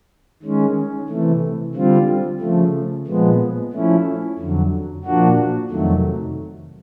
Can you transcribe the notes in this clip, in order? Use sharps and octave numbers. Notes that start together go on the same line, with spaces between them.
D#3 G#3 C#4
C3 E3 A3
D3 G3 C4 F4
C#3 F3 A3
A#2 F3 G#3 B3
F3 A3 C#4 E4
F2 D3 F#3
A#2 F3 A#3 D4 F#4
F2 C3 D#3 F#3 A3